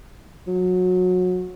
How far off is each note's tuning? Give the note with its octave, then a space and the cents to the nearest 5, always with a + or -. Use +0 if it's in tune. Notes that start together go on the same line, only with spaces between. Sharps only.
F#3 -25